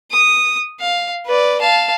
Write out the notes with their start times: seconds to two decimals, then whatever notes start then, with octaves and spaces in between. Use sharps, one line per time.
0.12 D#6
0.80 F5
1.26 B4 D5
1.61 F5 A5